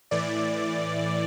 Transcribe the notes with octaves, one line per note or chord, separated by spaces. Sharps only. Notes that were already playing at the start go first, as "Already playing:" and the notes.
A2 E3 D5